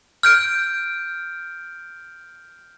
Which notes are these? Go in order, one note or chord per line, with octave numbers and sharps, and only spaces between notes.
F6 G6 D7